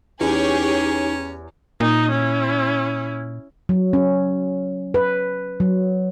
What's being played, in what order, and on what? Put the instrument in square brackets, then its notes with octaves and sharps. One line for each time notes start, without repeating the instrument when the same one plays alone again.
[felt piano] E2 [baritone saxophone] C#4 [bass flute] D#4 [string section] G4 G#4 C#5
[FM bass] A#2 [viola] D#4 D#5
[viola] C#4 E4
[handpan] F#3
C#4
B4
F#3